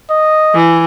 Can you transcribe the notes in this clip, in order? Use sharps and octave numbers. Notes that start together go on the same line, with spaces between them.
D#5
E3